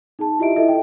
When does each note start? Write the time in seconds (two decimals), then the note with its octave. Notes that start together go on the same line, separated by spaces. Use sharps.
0.19 D#4 G#4 A5
0.39 E4 F4 G4 D#5 E5 D7
0.56 E4 A4 D#5 E5
0.68 G5